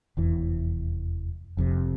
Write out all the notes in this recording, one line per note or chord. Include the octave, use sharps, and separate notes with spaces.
F1 E2 E3
F1 F2 C3